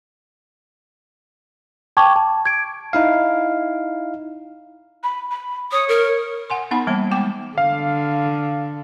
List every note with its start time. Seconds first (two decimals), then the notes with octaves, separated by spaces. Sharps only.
1.97 G5 A5 C#6 D6 G#6
2.16 A5
2.46 G#6 D7
2.93 D#4 E4 F5
5.03 B5
5.31 B5
5.72 C#5 D#6
5.89 A#4
6.50 F#5 G#5 C6
6.71 B3 D#4 F#5 B5
6.87 E3 G3 A#3 A5
7.11 G#3 B3 G5 D6
7.58 D3 F5